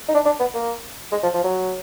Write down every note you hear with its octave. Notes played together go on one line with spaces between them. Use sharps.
D#4
D4
D4
B3
A#3
G#3
F3
F3
F#3